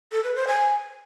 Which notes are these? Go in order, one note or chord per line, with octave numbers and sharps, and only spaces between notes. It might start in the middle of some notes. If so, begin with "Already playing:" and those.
A4
B4
C5
G#5